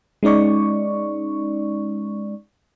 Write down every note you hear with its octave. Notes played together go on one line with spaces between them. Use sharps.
G#3 C#4 D#4 D5 C#6